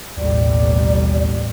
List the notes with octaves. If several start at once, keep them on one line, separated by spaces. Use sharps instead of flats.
A1 D#2 B2 G3 D5